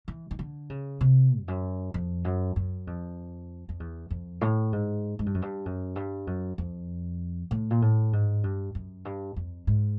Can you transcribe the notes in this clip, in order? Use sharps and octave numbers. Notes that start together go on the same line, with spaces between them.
E3
D#3
D3
C#3
C3
F2
F#2
F2
F#2
F#2
F2
F2
E2
F2
A2
G#2
G#2
G2
F#2
G2
F#2
G2
F#2
F2
A2
A#2
A2
G#2
G2
F#2
G2
F2
G#2